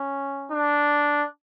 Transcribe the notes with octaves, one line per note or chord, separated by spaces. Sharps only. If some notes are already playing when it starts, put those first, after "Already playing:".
Already playing: C#4
D4